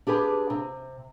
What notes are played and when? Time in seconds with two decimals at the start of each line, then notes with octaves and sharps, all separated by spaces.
0.07 D4 G4 G#4 B4
0.50 C3